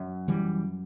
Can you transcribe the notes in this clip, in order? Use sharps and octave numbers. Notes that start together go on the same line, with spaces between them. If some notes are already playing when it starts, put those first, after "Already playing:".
Already playing: F#2
E3 G3